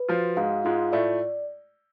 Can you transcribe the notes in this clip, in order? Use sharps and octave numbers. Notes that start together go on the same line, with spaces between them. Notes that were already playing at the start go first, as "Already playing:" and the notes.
Already playing: B4
F3 F4 F#4
G#2 G#3 F5
G#2 G#3 F4
A2 A3 D5